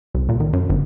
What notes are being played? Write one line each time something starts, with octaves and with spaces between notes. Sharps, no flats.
C2
A#2
D#3
F#2
G1